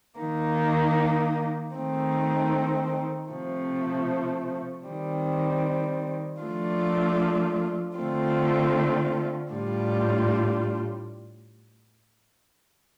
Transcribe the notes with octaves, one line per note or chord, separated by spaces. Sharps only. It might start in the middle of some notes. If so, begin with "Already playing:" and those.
D#3 A#3 D#4
D#3 A3 C4 D#4
C3 F3 A3
D#3 G3 C4
F3 A3 D4 F4
D3 A3 C4 F4
A2 G3 D4 F4